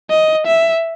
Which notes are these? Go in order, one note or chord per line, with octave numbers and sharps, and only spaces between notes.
D#5
E5